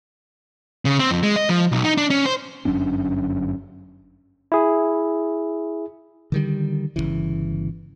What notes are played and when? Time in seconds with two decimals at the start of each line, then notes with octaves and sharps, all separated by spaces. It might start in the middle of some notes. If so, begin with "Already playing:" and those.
0.85 C#3
0.99 C4
1.11 F2
1.23 G#3
1.36 D#5
1.49 F3
1.72 B1
1.84 D#4
1.97 D4
2.10 C#4
2.25 C5
2.65 G1 F#2 C#4 D4
4.52 E4 G#4
6.32 D3 D#3 G3
6.96 G1 D#2 C#3 E3